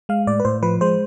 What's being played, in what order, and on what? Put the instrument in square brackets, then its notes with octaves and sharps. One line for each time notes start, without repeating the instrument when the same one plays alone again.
[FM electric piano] G#3 F5
A2 D5
B4
A2 C5
F3 B4
G#3 C5